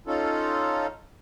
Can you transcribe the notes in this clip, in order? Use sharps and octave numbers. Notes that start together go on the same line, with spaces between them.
C#4 D#4 F4 A4